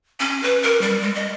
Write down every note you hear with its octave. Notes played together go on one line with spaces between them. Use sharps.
C#4
B4
A#4
G3
G#3
D#5